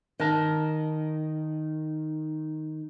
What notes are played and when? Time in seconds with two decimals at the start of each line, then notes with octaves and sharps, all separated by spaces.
0.20 D#3 A#4 A5